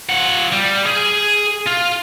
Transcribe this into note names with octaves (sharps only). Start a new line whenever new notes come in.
F3 F#5
G3
G#4
F4